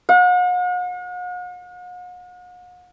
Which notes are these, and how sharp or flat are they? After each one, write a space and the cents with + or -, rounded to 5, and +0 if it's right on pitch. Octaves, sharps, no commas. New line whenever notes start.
F#5 -45